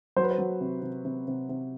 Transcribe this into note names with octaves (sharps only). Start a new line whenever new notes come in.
F#3 C5
B4
C5
F#3
C3
C3
C3
C3
C3